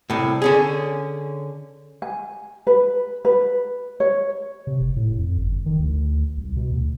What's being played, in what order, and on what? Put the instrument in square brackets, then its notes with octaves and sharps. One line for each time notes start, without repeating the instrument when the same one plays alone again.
[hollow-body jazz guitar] C2 A2
D3 C#4 G#4
[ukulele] G#5
B4
B4
C#5
[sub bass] C3
F#1
A2
F2
G1
D#3
D2
C2
B2
D2